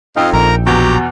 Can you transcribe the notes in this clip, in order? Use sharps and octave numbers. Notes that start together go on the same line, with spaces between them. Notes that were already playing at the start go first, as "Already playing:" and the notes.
F2 D#4 D#5 F5 G5 E6
A#1 A#4 A#5
E2 B2 F#3 F#4 G4 A#5